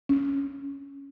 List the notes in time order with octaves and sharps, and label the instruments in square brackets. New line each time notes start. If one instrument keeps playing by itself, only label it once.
[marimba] C#4